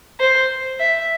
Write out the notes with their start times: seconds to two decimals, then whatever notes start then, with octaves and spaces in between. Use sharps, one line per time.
0.20 C5
0.80 E5